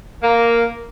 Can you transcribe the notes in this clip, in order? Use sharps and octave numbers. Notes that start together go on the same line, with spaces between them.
A#3